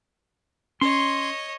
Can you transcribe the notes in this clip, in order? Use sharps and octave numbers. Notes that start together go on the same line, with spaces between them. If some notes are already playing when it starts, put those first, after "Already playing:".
C#4 C#5 D#5 C6